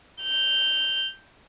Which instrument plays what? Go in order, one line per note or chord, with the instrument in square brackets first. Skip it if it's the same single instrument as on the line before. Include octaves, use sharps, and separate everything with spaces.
[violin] G6 F7